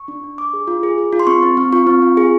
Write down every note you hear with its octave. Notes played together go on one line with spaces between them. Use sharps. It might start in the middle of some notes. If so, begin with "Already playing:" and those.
Already playing: C#6
D4
D4
D4 D6
G#4
F4
G#4
G#4
F4
C6
C4 C#6
C4
C4
F4 C#6
C4
F4
G#4